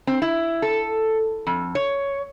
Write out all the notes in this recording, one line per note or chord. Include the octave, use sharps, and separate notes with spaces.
C4
E4
A4
F2
C#5